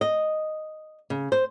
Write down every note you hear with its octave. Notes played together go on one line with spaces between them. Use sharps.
D#5
C#3
C5